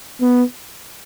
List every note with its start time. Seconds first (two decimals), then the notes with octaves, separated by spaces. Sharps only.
0.21 B3